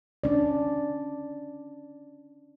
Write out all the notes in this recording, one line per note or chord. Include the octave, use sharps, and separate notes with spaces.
C#4 D4 D5